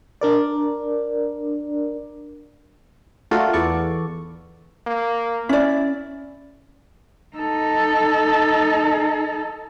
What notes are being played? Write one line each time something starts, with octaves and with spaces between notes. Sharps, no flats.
D4 A#4 D5
A3 D4 F4 F#4 A4 A#4
E2 B3 A4 D5 C#6
A#3
C#4 E4 D5
D#4 A4